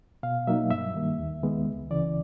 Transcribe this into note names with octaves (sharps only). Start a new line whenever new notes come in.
B2 F5
F#3 A#3 D#4 E5
G2 E5
D#3 G3 A#3
D#2
D#3 G#3 B3
C#2
C#3 E3 D5